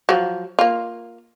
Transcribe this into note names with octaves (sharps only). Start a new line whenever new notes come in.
F3 F#3
A#3 F4